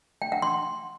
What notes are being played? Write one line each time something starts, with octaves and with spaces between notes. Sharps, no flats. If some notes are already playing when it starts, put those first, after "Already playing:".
G5
F#5
C6